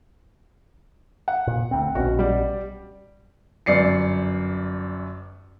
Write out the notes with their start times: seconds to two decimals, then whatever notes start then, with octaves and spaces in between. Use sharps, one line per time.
1.28 F#5
1.47 A#2
1.71 D2 C4
1.95 A#1 B2 C#4 F#4
2.19 G3 D5
3.66 G1 F#2 D5 C7 C#7